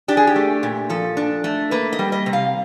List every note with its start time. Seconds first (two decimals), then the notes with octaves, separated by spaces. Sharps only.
0.08 D4 G4
0.17 G#4
0.27 G4
0.36 A3
0.63 A#2
0.89 F3 A4
1.17 D4
1.44 A3
1.71 A#3 B4
1.93 D#5
1.99 G3
2.12 D#5
2.26 C3
2.33 F5